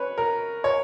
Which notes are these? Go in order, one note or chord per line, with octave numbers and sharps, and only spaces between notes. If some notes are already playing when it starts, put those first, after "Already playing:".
Already playing: C#4 B4 C#5
A#4
C#5